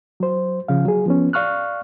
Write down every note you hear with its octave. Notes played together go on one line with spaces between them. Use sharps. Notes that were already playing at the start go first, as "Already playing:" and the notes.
F#3 C5
C#3 F3 F5
F#3 G#4
F3 B3 C#4
D5 F5 C#6 F6 F#6